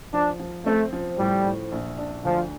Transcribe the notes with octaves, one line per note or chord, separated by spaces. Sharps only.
F3 D4
F3
A3 C4
F3
A2 G3
A2
A#1
D4
D2 F3